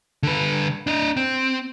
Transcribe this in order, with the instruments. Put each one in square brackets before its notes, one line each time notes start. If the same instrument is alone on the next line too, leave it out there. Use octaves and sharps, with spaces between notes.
[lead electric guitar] D3 B4
D4 D#5
C4